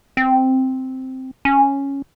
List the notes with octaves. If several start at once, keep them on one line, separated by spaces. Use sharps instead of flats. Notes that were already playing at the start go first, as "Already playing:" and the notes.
C4
C#4